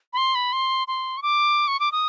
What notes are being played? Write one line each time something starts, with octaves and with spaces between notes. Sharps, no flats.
B5
C6
B5
C6
C6
C#6
D6
C#6
D6
D#6